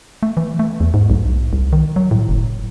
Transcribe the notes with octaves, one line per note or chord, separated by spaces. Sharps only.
A3
E3
A3
E2
G#2
B1
C2
D#3
F#3
A2
F#1